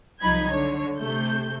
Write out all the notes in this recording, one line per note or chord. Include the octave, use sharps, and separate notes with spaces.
C2 F3 F#3 D#4 B5 G#6
D3 C#5
C3 A3 G6